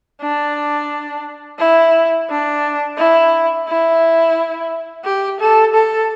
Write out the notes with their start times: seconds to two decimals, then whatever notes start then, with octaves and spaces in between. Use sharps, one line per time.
0.22 D4
1.60 E4
2.30 D4
2.97 E4
3.68 E4
5.04 G4
5.40 A4
5.74 A4